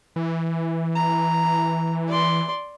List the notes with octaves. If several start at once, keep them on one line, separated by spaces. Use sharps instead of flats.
E3
A#5
D5 C6